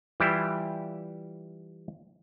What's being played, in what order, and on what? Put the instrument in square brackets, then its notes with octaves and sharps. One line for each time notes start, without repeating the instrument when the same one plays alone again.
[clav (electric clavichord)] E3 G3 E4 F4 G4